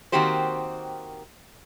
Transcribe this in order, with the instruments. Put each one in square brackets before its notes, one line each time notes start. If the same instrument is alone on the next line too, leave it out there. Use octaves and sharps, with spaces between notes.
[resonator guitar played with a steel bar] D#3 A#3 C4 F#4 G4 C5